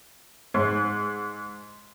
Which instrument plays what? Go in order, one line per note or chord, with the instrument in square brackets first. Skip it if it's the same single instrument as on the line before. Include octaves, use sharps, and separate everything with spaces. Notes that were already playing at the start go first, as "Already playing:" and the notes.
[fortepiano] G#2